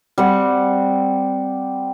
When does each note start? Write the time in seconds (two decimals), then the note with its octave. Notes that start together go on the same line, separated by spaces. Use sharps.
0.18 G3 C4 F#5